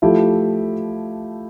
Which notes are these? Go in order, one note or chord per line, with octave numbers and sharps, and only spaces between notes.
F3 A3 E4 G4